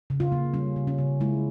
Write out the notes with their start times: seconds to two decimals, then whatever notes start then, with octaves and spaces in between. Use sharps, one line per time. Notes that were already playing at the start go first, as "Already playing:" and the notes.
0.10 C#3
0.20 F4
0.32 A#3
0.54 G3 C#4
0.76 C#3
0.87 C#4
0.98 C#3
1.21 G#3 E4